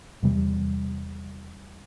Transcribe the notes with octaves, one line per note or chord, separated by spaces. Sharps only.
E2 C3 G3